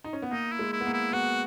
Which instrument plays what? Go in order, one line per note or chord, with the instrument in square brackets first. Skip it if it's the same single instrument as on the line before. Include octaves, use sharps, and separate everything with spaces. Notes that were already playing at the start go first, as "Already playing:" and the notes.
[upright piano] D#4
C#4
B3
[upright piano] A#3 [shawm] D#4
[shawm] E4
[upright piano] G#3
[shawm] E4
[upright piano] B3
A#3
[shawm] E4
[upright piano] B3 [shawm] F#4